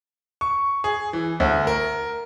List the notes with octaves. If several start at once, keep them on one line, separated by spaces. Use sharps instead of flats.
C#6
G#4
E3
D2
A#4